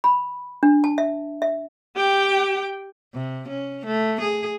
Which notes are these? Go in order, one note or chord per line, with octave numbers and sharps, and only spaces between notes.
B5
D4
A5
E5
E5
G4 G5
C3
C#4
A3
G#4